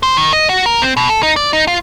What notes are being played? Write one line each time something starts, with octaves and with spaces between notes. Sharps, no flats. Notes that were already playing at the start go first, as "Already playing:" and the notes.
C5
D#3
D#5
F#4
A#4
C4
B2
A4
D#4
D5
D#4
F4